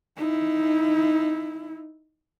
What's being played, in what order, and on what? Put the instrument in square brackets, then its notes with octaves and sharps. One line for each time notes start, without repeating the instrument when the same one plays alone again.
[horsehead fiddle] D#4 E4